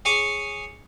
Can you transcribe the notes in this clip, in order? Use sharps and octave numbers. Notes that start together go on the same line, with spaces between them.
G#4 C#5 G#5 D6